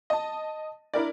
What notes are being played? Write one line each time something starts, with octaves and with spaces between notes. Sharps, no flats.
D#5 A5
D4 E4 A#4 D5